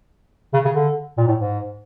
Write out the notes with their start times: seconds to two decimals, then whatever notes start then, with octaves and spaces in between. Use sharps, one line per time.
0.54 C#3
0.65 C#3
0.75 D3
1.18 A#2
1.27 A2
1.37 G#2